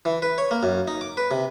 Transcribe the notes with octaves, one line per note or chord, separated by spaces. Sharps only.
E3
B4
C#5
A#3
F#2
D#4
D6
B4
C3